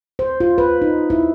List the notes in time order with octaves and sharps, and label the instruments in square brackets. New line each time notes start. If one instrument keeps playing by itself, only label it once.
[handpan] C5
F4
B4
D#4
E4